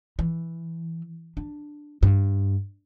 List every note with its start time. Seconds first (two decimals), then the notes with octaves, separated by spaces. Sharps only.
0.19 E3
1.37 D4
2.03 G2